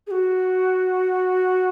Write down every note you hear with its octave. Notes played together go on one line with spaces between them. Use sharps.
G#4
F#4